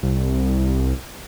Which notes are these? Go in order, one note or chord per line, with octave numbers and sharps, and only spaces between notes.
C2